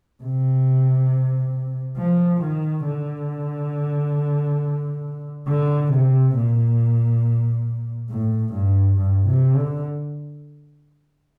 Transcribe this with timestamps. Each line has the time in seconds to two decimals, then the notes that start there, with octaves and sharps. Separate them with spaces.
0.23 C3
1.98 F3
2.42 D#3
2.85 D3
5.48 D3
5.92 C3
6.35 A#2
8.10 A2
8.53 G2
8.97 G2
9.26 C3
9.55 D3